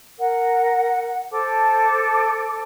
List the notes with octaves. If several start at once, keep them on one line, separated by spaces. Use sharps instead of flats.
A#4 F#5
A4 C5 A5 D6